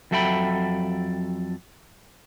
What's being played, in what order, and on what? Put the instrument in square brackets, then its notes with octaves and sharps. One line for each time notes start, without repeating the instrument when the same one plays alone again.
[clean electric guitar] F2 F#3 A4 E5 G5 B5